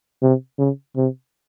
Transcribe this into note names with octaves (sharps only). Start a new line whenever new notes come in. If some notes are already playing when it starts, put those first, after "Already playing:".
C3
C#3
C3